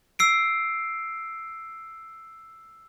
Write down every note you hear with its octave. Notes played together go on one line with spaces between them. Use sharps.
E6 C7 D7